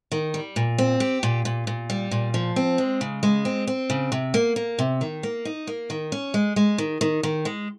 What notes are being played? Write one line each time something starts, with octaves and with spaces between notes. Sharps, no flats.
D#3
G3
A#2
C4
G4
A#2
A#2
A#2
G3
A#2
F3
C4
G#3
C#3
G#3
C4
C4
C#3
C3
A#3
A#3
C3
D#3
A#3
D#4
A#3
D#3
C#4
G#3
G#3
D#3
D#3
D#3
G#3